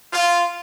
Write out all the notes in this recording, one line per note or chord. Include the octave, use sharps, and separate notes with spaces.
F4